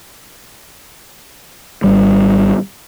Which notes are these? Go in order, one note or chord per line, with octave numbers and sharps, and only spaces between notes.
G#1 G3